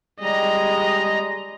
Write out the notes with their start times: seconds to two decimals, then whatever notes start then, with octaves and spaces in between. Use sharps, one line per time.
0.20 G3 G#3 G#4 D#5 A#5